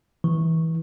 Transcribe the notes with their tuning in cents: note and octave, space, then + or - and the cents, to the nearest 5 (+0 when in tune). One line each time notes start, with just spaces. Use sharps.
E3 -25